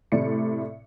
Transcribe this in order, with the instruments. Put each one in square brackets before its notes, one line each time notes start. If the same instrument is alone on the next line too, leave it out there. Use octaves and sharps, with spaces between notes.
[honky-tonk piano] A2 C3 D5 C#7